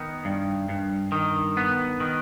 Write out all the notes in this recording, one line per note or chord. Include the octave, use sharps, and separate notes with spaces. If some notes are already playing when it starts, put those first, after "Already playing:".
Already playing: D#3 B3
G2
G2
D#3
B3
D#3